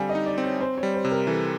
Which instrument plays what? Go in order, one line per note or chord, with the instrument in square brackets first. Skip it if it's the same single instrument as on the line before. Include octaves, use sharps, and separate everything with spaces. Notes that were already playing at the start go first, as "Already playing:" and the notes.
Already playing: [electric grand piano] D3 G3 C4 [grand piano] F5 G#5
[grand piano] D#5
[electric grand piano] D#4
[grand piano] D5
[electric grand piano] C4
[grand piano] C#5
[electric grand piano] C4 [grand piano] C5
[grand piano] C#5
[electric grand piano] G3
[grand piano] C5
[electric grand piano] C3
[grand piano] A#4
[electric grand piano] E3 [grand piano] A4